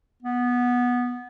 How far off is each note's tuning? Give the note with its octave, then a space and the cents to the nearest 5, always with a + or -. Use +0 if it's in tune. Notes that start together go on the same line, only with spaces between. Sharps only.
B3 -10